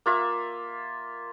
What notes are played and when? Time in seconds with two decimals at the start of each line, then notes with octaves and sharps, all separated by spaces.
0.06 A#3 F4 E5